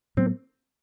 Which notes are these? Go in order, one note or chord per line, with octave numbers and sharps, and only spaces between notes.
A2 F#3 B3 C4